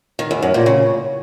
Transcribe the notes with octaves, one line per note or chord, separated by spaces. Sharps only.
D#3
E2
F#2
A#2
C#3